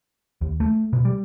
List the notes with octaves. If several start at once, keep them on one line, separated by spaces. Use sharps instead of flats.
D#2
A3
B2
G3